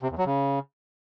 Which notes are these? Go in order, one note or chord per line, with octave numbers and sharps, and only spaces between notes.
C3
E2
F#3
C#3